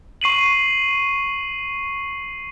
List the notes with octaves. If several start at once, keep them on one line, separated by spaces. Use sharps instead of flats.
C#6 C7 D#7 F#7